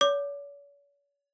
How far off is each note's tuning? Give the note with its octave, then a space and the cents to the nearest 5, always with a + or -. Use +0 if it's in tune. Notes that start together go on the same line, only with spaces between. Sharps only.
C#5 +45 D6 +15